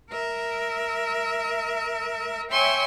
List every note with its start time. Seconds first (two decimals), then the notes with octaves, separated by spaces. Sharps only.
0.10 A#4 E5
2.49 C#5 E5 G5 G#5 C6 C#6